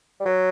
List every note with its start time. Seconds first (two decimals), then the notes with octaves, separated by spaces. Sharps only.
0.20 G3
0.25 F#3